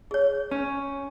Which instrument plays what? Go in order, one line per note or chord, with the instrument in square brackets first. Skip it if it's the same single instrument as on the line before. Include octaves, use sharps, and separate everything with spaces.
[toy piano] G#4 C#5
[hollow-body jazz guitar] C#4